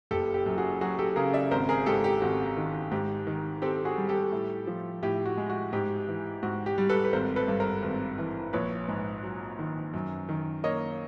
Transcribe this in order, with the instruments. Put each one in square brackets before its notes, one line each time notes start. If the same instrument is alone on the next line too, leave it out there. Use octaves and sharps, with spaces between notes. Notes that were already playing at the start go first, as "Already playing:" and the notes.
[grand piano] F#1 G4 A4
G4
F#2
F#4 G#4
F#3 F#4 G#4
G4 A4
C#3 G#4 A#4
D5 E5
G#1 A#4 C5
G#4 A#4
G#2 G4 A4
G4
G#1 F#4
D#3
G#2 G4
D#3
C4 G4 A4
F#4 G#4
G3
G4 A4
A2
F3
A2 G4
F#4
G#3
F#4
G#2 G4
E3
G#2 F#4
G4
G3
A4 B4
B4
G#1 A#4 C5
A4 B4
G2
A#4 C5
G#1
E3
A#1 B4 C#5
G#2
F#3
D#3
F#2
D#3
A#3 C#5 D#5